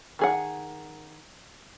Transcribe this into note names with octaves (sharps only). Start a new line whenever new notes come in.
D#3 G#4 F#5